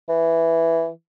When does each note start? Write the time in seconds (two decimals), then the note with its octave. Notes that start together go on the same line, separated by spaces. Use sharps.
0.09 E3